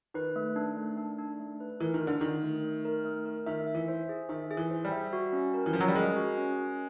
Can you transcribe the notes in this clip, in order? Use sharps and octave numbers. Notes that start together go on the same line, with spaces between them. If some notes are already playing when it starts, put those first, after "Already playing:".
D#3 B4
A3
D4
A3
D4
D4
A3
B4
E3 A#4
D#3
F4
D3
D#3 A#4
A3
A3
A#4
A3
A#4
D#3 E5
E5
E3
C5
G#4
D#3 E5
G#4
E3
C5
G3
E5
F#4
C#4
A#4
E3
F3 C#4
F#3
G3
G#3 A#4
F#4
C#4
A#4